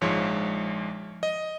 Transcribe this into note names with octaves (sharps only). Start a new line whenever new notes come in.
A#1 G#2 F3 G#3 C#5
D#5